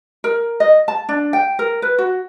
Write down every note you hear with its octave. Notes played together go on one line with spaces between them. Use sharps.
A#4
D#5
A5
D4
G5
A#4
B4
F#4